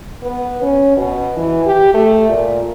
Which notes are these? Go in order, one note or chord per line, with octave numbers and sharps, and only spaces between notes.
B3
C#4
B2
E3
G4
A3
A#2